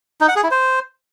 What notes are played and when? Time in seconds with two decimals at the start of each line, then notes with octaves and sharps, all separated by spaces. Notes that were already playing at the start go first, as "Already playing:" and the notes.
0.21 D#4
0.28 F#5
0.36 G#4
0.43 E4
0.51 C5